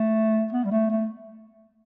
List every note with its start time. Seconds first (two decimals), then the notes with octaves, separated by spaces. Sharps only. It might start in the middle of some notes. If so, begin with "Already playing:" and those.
Already playing: A3
0.53 B3
0.65 G3
0.71 A3
0.90 A3